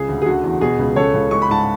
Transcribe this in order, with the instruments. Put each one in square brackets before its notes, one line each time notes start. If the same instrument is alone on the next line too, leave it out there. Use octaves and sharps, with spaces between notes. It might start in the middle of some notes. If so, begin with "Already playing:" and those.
Already playing: [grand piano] C#2 C#3 G#4
D2
G#4
D3 F#4
E2
B2 G#4
C#2
C#3 A4 C#5
C#2
G#3 C#6
B5
G#2 A5